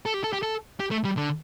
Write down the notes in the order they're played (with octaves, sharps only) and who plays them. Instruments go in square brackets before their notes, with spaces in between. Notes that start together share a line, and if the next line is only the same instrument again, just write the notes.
[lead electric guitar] A4
G4
A4
G4
A4
G4
A3
G3
D3